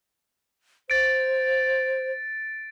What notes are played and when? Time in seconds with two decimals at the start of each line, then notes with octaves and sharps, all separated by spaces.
0.90 C5 A6 D7